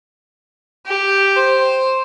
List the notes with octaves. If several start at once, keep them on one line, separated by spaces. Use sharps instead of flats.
G4
C5